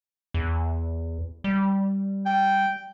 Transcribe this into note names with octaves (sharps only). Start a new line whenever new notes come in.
E2
G3
G5